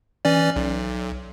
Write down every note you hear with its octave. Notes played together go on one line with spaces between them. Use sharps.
E3 C#4 D5
B1